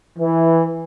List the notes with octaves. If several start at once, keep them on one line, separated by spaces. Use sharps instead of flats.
E3